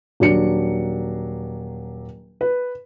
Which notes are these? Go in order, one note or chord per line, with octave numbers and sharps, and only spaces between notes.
D#1 F#3 D4 C#7
B4